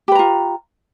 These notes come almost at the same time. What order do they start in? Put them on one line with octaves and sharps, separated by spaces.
G4 B4 A#5 F4